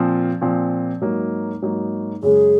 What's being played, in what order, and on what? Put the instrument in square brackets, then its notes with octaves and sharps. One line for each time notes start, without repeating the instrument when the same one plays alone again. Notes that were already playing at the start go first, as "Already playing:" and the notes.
Already playing: [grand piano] A#2 F3 C4
A#2 F3 C4
G#2 F#3 A#3 D#4
G#2 F#3 A#3 D#4
[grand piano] F#2 C#3 G#3 [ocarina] G#4